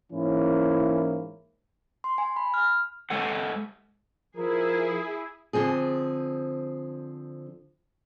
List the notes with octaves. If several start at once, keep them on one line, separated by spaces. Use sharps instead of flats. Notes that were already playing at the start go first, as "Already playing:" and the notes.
G#2 E3 A#3 C#4 E4
C6
G#5
B5
F6
G#3 A4 F#5
F3 E4 G#4 A#4
D3 F3 C4 G#4